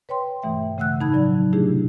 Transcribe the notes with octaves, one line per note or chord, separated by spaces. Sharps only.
B4 C#5 G5 C6
G2 B2 E3 A3 E5 G5
C#3 A3 F#5 E6 F#6
A2 D#3 D#4 A5 B5 G#6
C#3 F3 F#3 D5
C3 A3 D4 E4 G4 G#4